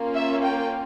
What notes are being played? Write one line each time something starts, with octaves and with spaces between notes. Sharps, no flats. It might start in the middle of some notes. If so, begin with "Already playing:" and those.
Already playing: A#3 C#4 F4
E5
G5